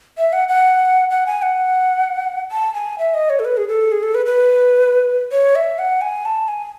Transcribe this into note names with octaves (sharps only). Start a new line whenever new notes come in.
E5
F#5
F#5
F#5
G#5
F#5
A5
G#5
E5
D#5
C#5
A4
B4
G#4
A4
G#4
A4
B4
B4
C#5
E5
F#5
G#5
A5
G#5